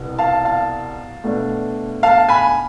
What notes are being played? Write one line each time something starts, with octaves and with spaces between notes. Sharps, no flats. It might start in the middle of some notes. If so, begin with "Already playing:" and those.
Already playing: C2 B2 B3
F5 A5
F5 A5
B2 A3 D4
F5 A5
G#5 B5